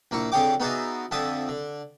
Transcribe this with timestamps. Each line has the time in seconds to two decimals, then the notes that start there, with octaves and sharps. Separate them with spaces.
0.11 A#1 A#3 E4 C#6
0.32 F2 D3 G#4 C#5 G5 D6
0.60 B3 D#4 F#4 G#4 D5 E5
1.11 F2 D3 F3 E5 A5 D#6
1.49 D3